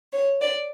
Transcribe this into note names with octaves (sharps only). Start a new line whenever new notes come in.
C#5
D5